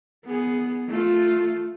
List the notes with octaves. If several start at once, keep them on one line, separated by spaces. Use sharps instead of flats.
B3 G#4
A3 F4